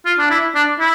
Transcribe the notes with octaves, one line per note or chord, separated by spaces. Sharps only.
F4
D4
E4
D4
E4